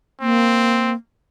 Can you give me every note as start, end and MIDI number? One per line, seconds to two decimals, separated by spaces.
0.21 0.94 58
0.21 0.92 60